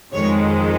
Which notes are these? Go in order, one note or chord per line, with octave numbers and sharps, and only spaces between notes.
F2 D#3 G#3 C#5